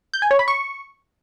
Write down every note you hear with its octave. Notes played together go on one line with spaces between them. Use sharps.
G6
G#5
C#5
B5
C#6